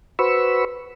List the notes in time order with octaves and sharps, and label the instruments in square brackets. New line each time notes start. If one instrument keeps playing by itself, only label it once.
[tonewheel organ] F#4 B4 C5 B5 C#6 E6